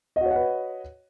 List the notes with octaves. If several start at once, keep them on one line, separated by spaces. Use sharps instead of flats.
F#4 B4 C#5 D#5 F#5